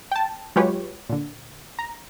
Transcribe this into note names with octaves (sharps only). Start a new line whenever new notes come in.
G5 A5
F#3 G#3 F4 G4 B4 C#5
A#2 D3
A#5